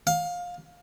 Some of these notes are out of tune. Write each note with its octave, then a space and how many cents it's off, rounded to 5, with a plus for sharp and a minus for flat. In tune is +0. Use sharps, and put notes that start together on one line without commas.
F5 +20